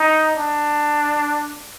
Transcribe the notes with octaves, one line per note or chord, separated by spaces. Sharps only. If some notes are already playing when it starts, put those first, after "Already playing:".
Already playing: D#4
D4